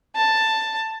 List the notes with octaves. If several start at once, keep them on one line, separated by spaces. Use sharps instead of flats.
A5